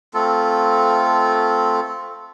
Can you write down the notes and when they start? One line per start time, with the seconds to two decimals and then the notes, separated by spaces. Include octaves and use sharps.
0.14 A3 C4 F4 A4